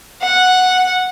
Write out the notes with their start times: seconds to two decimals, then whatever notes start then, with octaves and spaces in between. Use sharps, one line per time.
0.22 F#5